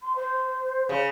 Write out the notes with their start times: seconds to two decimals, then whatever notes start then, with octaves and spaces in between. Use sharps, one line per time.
0.01 C6
0.15 C5
0.89 C#3